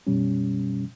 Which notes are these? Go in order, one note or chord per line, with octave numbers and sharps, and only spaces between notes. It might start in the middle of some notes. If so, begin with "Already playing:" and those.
F#2 B2 G3 C#4